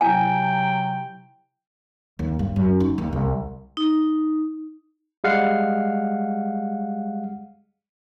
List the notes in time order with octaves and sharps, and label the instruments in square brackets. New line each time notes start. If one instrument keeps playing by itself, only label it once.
[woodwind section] C3 F#3 G5 [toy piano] E4 G#5
[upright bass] D#2
G2
F#2
D#4
D#2
C2
[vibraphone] D#4
[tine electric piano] G3 G#3 F5 F#5 C7